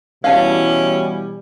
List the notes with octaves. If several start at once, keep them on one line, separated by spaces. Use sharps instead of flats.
B2 E3 G3 C#4 E4 F5 A5